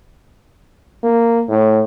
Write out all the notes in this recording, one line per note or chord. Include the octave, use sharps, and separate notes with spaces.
A#3
A2